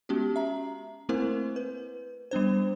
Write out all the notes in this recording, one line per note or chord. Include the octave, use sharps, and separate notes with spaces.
G#3 B3 C#4 F#4 G4
E5 A#5
A3 A#3 C4 E4 A#4 C5
B4
G3 B3 D4 C5